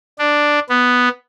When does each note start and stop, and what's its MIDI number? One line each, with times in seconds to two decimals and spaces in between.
0.19 0.59 62
0.69 1.09 59